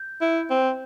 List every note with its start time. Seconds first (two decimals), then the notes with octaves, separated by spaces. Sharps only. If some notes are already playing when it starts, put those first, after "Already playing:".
Already playing: G6
0.21 E4
0.50 C4